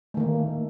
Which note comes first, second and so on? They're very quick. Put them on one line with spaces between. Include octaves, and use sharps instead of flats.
A3 D#3 A#3